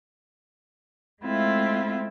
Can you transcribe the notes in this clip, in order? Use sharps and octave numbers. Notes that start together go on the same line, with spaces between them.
G#3 A3 C4 E4 F4 E5